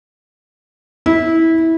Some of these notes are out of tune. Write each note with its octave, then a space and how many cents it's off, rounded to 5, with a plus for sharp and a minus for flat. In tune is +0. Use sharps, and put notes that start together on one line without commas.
E4 -20